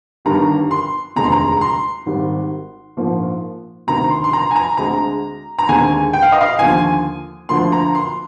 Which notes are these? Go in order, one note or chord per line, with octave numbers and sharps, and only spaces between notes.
G1 G2 D#3 G3 A#5
C6
F1 D#2 D3 G#3 C4 A#5
C6
A#5
A#5
C6
G#1 G#2 D#3 G3
A#1 G#2 F3 A#3
D2 C3 D#3 A#5
C6
C6
A#5
G#5
A#5
D2 D3 G#3 C4 A#5
A#5
D#2 D3 G#3 C4 G#5
G5
F5
D#5
F5
D#2 D3 F3 G#5
D2 D3 F3 A#3 C6
A#5
C6